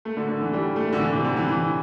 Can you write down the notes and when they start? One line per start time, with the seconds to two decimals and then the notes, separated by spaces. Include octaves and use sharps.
0.05 A3
0.17 D3
0.29 D3
0.41 E3
0.53 G3
0.76 A3
0.93 D3
1.00 E3
1.13 C3
1.24 D3
1.37 E3
1.48 E3